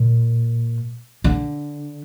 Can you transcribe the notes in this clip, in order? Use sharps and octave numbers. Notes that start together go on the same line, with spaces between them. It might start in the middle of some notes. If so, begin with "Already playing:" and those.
Already playing: A#2
D3